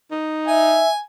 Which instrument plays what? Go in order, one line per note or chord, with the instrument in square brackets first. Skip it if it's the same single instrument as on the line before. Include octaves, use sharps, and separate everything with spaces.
[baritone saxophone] D#4
[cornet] E5 [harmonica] G#5